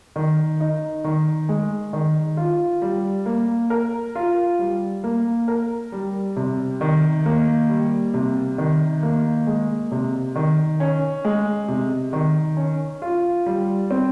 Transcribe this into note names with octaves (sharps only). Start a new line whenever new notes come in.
D#3
D#4
D#3
G#3
D#3
F4
G3
A#3
A#4
F4
G3
A#3
A#4
G3
C3
D#3
A#3
G3
C3
D#3
A#3
G#3
C3
D#3
C#4
G#3
C3
D#3
C#4
F4
G3
C4